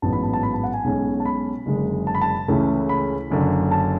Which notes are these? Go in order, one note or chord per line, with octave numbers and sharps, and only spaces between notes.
A1 G#2 F#3 B3 A5
B5
A5
A5
B5
A5
F#5
G#5
B1 B2 G#3 C#4
A5
B5
F#1 F#2 D3 G#3
A5
B5
A5
C#2 C#3 E3 A3 C#4
B5
F#1 F#2 D3
A5